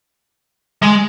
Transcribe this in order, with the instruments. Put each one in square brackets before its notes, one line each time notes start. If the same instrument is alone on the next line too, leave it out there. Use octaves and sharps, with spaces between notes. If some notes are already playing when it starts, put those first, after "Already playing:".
[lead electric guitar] G#3